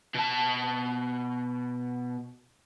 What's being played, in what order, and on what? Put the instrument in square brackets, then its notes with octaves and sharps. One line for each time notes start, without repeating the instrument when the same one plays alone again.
[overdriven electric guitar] B2 A5